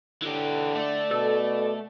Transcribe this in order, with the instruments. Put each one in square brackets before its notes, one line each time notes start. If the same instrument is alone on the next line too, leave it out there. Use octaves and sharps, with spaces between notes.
[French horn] D3 [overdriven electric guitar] E3 G4
[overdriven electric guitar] A3 [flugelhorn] D5
[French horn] B2 [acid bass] A4